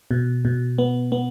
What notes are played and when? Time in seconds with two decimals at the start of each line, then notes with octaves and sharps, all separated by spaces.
0.11 B2
0.45 B2
0.78 B3
1.12 B3